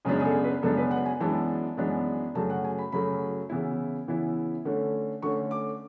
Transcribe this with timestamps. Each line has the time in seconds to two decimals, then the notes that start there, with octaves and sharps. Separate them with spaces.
0.05 F#2 C#3 G#3 B3 D4 G#4
0.20 G#4
0.25 A4
0.44 B4
0.62 F#2 C#3 G#3 B3 D4 A4
0.77 B4
0.91 F#5
1.06 G#5
1.20 F#2 E3 G#3 B3 D4 A5
1.77 F#2 E3 G#3 B3 D4
2.35 F#2 C#3 F#3 A3 A5
2.50 F#5
2.64 G#5
2.78 B5
2.92 F#2 C#3 F#3 A3 B5
3.49 C#3 E3 B3 E4
4.08 C#3 E3 B3 E4
4.65 D3 A3 C#4
5.22 D3 A3 C#4 C#6
5.51 D6